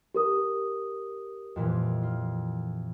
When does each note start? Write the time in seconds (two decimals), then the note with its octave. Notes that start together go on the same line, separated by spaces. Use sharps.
0.15 G4 A#4 D#6
1.56 F2 A#2 E3
2.03 F4